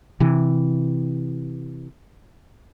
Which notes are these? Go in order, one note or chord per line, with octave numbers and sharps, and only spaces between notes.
C3 E3